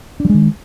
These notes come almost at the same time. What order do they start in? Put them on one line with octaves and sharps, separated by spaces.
D4 F#3 G#3 D#3